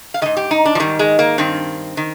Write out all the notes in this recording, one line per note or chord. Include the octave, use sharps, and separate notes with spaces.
F5
G#2 D#3 D#5
G4
D#4
D4
F3
G#2 D#3 G3
G#3
A#3
G2 D#3 C4
D#3